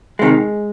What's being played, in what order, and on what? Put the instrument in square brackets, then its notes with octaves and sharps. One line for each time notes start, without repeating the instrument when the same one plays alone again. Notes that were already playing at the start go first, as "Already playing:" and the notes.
[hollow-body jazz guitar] C3 D#3 G#3